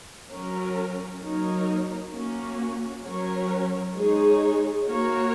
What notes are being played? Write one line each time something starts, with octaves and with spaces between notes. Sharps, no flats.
F#3 C#4 A#4
F#3 A#3 D#4 A#4 C#5
A#3 C#4 F#4
F#3 C#4 A#4 C#5
G#3 D#4 G#4 C#5
A#3 F#4 A#4 C#5